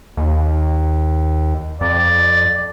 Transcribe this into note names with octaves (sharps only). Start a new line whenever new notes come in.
D#2
F2 D5